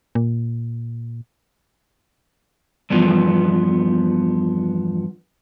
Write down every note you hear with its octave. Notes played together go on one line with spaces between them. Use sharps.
A#2
E2 G2 E3 F3 B3